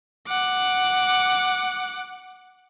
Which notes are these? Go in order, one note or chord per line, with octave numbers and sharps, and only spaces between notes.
F#5 D6